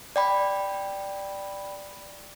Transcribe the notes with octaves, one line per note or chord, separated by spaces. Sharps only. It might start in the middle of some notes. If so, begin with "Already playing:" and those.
D5 G5 B5